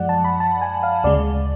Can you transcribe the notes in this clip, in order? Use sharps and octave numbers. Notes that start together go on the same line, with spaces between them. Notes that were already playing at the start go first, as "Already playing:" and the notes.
Already playing: F#2 F3 G#3 D5 F#5
A5
B5
A5
G#5
F5
D2 C#3 G#3 D5